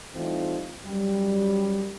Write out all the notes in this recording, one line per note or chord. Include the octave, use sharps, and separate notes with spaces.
E3 G3 A3 C4 D#4 F4
F#2 G3